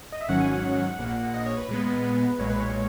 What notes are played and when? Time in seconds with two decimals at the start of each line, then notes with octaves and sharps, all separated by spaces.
0.12 D#5
0.21 E5
0.28 G#1 G#2 D#3 F#3 C#4 F#5
0.40 G#5
0.51 F#5
0.98 A#1 A#2 A#3
1.34 D#5
1.46 C#5
1.57 B4
1.69 A#2 G#3 B3
2.39 B1 A#2 G#3 C#5
2.50 B4
2.60 C#5